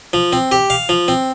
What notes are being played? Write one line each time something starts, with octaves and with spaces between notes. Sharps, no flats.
F3
C4
G4
F5
F3
C4